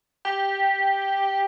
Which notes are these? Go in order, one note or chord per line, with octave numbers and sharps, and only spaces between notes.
G4